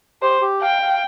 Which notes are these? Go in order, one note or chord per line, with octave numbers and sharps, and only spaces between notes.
G4 C5
G4
F5 G5
F5